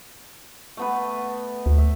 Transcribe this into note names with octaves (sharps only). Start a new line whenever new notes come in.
A3 B3 B4
D2
E5